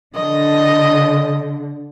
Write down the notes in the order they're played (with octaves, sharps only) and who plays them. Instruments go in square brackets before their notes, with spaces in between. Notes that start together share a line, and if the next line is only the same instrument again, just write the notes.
[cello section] D3 [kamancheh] D#5